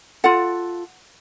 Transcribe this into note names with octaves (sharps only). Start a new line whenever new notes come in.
F4 A4 F#5